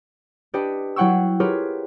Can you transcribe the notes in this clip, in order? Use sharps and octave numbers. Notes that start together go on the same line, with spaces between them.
D4 G4 B4 D#5 C#7
F#3 E4 F#5 G5 C#6 E6
F4 G4 G#4 A#4 B4 C#5